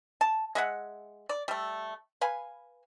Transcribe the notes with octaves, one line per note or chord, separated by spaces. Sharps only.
A5
G#3 E5 F#5
D5
G3 A3
B4 F5 G#5